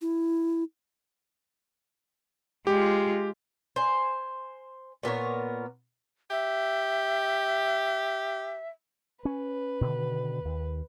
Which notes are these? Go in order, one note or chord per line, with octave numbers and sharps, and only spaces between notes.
E4
G#3 F4 G4
C5 G#5
A#2 B3 A#4 C#5
G4 E5
C#4 B4
B2 D3 D#3
D#2